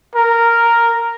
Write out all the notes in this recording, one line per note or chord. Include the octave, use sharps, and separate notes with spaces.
A#4